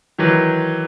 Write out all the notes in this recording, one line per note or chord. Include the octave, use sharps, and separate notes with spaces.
D#3 E3 F#3